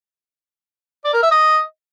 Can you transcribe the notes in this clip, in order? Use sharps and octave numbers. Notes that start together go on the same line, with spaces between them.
D5
A#4
E5
D#5